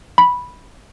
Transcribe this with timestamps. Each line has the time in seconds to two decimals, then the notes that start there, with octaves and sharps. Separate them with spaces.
0.18 B5